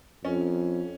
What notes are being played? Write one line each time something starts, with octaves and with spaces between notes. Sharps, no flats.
F2 C#4